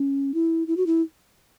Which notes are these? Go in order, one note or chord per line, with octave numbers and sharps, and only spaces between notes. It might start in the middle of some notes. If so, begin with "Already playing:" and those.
Already playing: C#4
E4
E4
F#4
E4